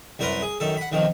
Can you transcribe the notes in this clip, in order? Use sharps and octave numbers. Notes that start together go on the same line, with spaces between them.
C2 F#2 A#4 B4 A#5 C6
G#4
F#2 D#3 A4
F#5 B5
B1 C3 D#3 F3